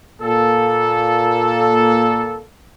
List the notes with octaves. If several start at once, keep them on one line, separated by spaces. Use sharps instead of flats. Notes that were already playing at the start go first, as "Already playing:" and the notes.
A#2 A#3 A4